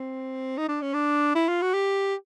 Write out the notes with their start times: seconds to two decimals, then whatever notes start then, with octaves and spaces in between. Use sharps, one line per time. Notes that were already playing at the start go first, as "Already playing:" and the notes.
Already playing: C4
0.57 D#4
0.68 D4
0.82 C#4
0.93 D4
1.35 E4
1.48 F4
1.62 F#4
1.74 G4